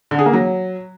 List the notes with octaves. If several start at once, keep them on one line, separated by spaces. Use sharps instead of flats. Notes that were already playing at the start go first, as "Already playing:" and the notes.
D3
G#4
A#3
F#3